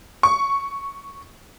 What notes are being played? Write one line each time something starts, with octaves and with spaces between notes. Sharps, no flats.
C#6